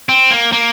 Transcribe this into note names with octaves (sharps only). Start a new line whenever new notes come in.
C4
A#3
A#3